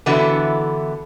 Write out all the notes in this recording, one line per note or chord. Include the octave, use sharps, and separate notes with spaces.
D3 E3 B3 E4 F#4 A4